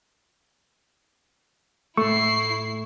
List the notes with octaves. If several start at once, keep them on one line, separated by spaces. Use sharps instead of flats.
A2 A3 E4 C#6 C7